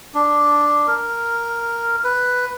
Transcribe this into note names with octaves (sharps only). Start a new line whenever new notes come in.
D4
A#4
B4